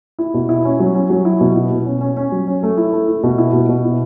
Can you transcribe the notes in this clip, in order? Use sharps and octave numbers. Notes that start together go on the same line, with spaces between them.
E4
B2
E4
C#4
F#3
C#4
F#3
E4
B2
E4
B2
C#4
C#4
C#4
F#3
C#4
A3
E4
A3
E4
B2
E4
B2
B2
E4